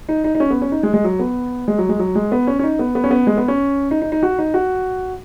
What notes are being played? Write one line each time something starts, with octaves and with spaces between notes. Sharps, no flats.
D#4
D#4
D#4
C#4
B3
C#4
D#4
G#3
G#3
F#3
B3
G#3
F#3
G#3
F#3
G#3
B3
C#4
C#4
D#4
B3
B3
C#4
B3
G#3
B3
C#4
D#4
D#4
D#4
F#4
D#4
F#4